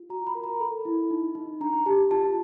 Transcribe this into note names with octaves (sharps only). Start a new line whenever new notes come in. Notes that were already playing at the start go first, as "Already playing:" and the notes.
Already playing: F4
F#4 A#5
B5
A#4
A#5
A4 B5
E4
D#4
D#4
D4 A#5
G4 A5
F4 A5